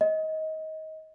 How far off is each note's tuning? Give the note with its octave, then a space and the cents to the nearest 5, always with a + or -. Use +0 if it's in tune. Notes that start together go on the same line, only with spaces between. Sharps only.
D#5 +20